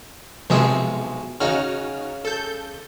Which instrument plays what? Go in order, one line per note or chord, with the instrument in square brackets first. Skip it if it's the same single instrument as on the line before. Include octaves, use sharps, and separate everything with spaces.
[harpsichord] B1 G#4 E5 [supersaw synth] C3 F3 G#3
[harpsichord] C#3 [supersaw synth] D#4 F#4 F6
[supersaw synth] A4 G6